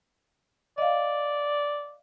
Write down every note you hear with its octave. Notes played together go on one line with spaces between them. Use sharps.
D5 D#5 F5